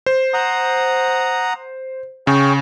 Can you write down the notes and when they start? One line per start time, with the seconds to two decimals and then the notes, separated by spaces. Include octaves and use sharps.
0.06 C5
0.34 F#5 A#5 D#6
2.27 C#3 G#4 C#5 G5